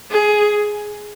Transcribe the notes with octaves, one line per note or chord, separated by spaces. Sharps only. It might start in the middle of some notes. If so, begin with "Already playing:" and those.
G#4